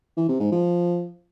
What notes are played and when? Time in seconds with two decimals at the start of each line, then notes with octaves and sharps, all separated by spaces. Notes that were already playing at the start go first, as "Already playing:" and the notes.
0.17 E3
0.29 C3
0.40 G#2
0.52 F3